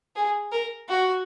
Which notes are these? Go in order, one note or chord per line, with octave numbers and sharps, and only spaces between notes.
G#4
A#4
F#4